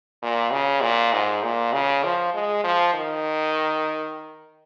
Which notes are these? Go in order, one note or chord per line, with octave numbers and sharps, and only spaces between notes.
A#2
C#3
A#2
G#2
A#2
C#3
F3
G#3
F3
D#3